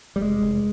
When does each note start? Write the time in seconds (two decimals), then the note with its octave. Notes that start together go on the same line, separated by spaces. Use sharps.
0.16 G3
0.21 F1 G#3
0.42 F1